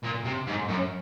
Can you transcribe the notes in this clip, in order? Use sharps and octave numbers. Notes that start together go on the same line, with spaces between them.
A#2
C3
G#2
F#2